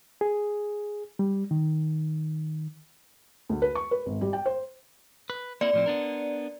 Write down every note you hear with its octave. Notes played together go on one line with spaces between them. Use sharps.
G#4
G3
D#3
D2
B4
C#6
B4
G#1
G3
G5
C5
B4
A#3 C4 E4 D5
A2 F3 C4
B3 D4 A#4